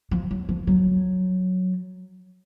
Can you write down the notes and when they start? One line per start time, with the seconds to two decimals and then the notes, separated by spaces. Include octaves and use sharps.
0.11 F3
0.31 F#3
0.49 F3
0.67 F#3